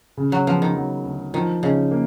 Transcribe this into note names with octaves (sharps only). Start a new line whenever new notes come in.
C#3
F#3
F3 B3
D#3
F#3
D2
D#3 F3
C#3 D#4
A#3